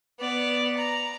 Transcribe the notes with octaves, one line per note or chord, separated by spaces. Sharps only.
B3 D5
A#5